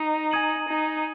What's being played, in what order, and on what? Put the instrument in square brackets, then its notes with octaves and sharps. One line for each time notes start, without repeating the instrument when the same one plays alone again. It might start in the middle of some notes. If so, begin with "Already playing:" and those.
Already playing: [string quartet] D#4
[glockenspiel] G#5 D#6 G#6 D#7 F#7
[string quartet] D#4